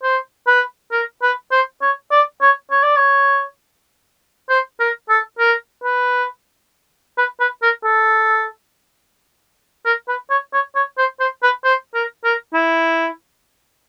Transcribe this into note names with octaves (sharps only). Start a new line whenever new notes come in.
C5
B4
A#4
B4
C5
C#5
D5
C#5
C#5
D5
C#5
C5
A#4
A4
A#4
B4
B4
B4
A#4
A4
A#4
B4
C#5
C#5
C#5
C5
C5
B4
C5
A#4
A#4
E4